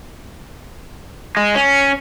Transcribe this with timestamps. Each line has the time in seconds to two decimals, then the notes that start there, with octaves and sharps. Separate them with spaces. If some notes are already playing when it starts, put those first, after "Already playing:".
1.37 G#3
1.55 C#4